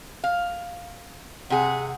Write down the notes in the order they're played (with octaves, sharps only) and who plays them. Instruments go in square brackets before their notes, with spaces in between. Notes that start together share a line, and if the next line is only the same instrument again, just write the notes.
[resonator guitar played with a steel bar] F5
[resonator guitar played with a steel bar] C3 G#4 [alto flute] F#5